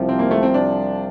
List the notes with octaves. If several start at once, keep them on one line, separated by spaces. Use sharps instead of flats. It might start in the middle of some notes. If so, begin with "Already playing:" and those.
Already playing: C2 C3 F3
C4
A#3
A3
C4
D4